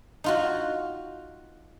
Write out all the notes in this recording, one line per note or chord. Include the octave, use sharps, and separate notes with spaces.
D#4 F4 F#4